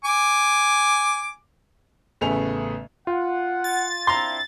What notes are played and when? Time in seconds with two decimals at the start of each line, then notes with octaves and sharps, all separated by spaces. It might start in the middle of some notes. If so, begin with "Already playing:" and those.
0.05 G#5 D6
2.21 A1 C#3 A3 B3 G#4 F7
3.07 F4 F#5
3.64 A6
4.07 C4 D4 E4 A#5 C6